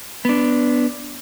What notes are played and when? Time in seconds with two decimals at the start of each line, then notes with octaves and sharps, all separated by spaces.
0.25 B3 D4